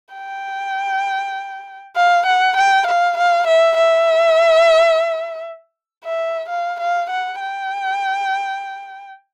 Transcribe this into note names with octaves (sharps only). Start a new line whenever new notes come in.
G5
F5
F#5
G5
F5
F5
E5
E5
E5
F5
F5
F#5
G5